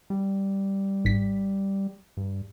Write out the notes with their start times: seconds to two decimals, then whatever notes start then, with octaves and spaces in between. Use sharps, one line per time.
0.10 G3
1.05 G#1 B6
2.17 G2